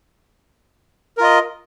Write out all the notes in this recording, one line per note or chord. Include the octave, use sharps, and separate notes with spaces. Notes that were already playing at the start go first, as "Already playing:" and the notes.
F4 A#4 D#5